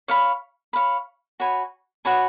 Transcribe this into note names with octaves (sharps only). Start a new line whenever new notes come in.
C#5 F5 B5
C#5 F5 B5
F#4 C#5 G#5 B5
F#4 C#5 G#5 B5